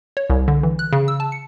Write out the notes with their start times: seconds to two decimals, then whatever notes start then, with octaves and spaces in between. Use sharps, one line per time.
0.17 C#5
0.30 C2
0.48 D3
0.63 E3
0.79 F#6
0.93 C#3
1.08 E6
1.20 A5
1.32 C#7